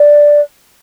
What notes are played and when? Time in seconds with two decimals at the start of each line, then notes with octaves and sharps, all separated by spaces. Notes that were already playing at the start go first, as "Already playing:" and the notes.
Already playing: D5